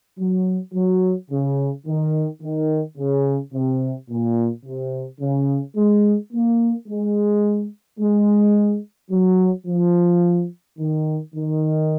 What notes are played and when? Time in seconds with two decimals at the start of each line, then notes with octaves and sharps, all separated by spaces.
0.19 F#3
0.74 F#3
1.31 C#3
1.87 D#3
2.42 D#3
2.98 C#3
3.53 C3
4.10 A#2
4.65 C3
5.20 C#3
5.76 G#3
6.33 A#3
6.88 G#3
7.99 G#3
9.11 F#3
9.67 F3
10.79 D#3
11.35 D#3